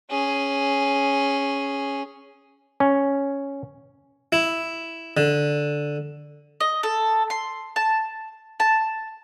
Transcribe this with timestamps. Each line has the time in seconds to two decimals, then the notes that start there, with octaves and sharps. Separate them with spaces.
0.10 C#4 G#4
2.80 C#4
4.32 E4
5.17 D3
6.60 D#5
6.83 A4
7.30 C6
7.76 A5
8.60 A5